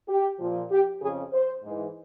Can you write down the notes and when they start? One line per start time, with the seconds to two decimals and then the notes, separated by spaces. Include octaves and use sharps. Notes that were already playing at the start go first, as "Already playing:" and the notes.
0.08 G4
0.39 A#2 F3
0.71 G4
1.01 F2 C#3 F3 G#4
1.33 C5
1.63 G#2
1.68 E3